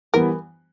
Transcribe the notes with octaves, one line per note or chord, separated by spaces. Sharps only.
E3 G3 B3 A#4